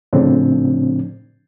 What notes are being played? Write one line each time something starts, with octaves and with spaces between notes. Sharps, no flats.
A2 C#3 F3 C4 D4